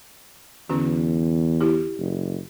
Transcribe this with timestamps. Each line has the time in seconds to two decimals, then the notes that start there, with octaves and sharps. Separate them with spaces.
0.69 E2 D3 C#4 F#4
1.61 E4 G4
1.99 F#1